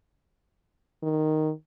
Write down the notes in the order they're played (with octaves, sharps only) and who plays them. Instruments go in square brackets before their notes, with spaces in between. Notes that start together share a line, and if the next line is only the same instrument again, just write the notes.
[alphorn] D#3